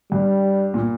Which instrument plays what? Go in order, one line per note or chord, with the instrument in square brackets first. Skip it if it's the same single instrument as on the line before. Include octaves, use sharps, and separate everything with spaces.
[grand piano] G2 [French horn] G3
[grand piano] A#2